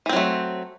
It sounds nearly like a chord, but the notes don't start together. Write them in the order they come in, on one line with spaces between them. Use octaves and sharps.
E3 C4 F#3 A3